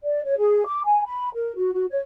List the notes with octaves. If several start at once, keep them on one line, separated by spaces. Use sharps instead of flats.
D5
C#5
G#4
D6
G#5
B5
A#4
F#4
F#4
C#5